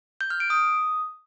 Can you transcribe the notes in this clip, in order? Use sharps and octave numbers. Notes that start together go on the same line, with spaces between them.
G6
F6
D7
D#6